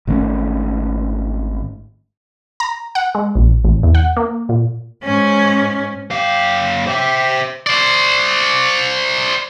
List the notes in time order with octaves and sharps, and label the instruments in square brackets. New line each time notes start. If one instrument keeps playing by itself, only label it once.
[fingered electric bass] G#1 D#3 A3 C#4
[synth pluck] A#5
F#5
G#3
A#1
A1
E2
F#5
A#3
A#2
[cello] G#2 C#4
[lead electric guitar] F#2 F5 [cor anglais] G4
[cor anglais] G4 [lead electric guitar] C5 E5
[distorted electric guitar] C5 D5